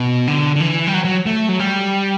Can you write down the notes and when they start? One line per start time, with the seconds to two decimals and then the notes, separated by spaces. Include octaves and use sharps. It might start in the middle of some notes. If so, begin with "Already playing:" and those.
Already playing: B2
0.28 D3
0.56 D3
0.60 E3
0.87 G3
0.94 F#3
1.05 F#3
1.26 A3
1.49 F#3
1.59 G3